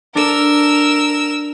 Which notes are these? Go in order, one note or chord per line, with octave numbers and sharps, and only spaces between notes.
D4 A4 A#4 E6